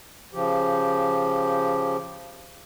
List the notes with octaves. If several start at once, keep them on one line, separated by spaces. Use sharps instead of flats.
C#3 F3 G4